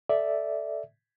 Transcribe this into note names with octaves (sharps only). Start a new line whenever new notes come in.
A4 D5 E5